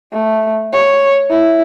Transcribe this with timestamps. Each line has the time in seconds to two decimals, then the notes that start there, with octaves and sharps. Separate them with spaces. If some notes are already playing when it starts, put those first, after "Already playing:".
0.12 A3
0.72 C#5
1.30 E4